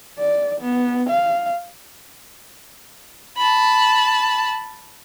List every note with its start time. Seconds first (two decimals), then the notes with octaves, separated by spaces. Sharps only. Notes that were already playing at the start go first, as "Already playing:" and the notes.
0.18 D5
0.60 B3
1.09 F5
3.37 A5 B5